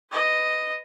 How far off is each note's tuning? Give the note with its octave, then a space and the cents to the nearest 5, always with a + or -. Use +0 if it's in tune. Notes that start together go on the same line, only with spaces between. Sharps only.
B4 +25 D#5 +0